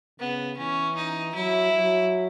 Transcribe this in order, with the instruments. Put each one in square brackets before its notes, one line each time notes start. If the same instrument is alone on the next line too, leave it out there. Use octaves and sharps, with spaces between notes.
[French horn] C#3 [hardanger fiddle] B3
[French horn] E3 [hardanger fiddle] C#4
[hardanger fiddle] D#4
[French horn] F#3 [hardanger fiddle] E4
[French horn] F#3